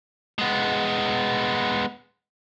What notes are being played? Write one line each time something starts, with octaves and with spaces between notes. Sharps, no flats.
G#3 B3